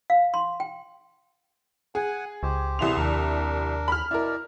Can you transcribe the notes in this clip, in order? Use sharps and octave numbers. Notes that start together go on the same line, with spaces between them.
F5
C6
G5
G#4 F#5 G#5
C#2 G4 C5
C2 B3 E4 G#4 C6 F7
D#2 D4 A#4
B5 F6
B2 E4 A#4 D5